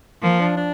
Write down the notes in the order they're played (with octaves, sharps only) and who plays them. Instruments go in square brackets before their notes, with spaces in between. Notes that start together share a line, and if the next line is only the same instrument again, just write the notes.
[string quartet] F3 [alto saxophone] A#3
[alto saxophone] D4
D4